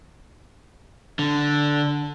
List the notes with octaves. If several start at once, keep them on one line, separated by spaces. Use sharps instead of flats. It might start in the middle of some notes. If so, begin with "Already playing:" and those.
D3